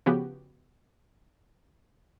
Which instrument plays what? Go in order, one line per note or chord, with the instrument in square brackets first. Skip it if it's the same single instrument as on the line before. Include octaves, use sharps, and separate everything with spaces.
[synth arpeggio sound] C#3 F3 B3 F#4 G4